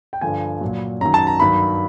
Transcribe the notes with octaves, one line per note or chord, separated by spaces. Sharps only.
G5
G2 D3 F3 G#5
A#2 F#3
F#2 D#3 F#3 A#5
A5
A#5
G2 D#3 F#3 B5